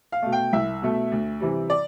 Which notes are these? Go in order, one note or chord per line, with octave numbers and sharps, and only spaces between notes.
F5
B2 A3
G5
C2 E5
B2 A3
D2
C3 E3 G3
D5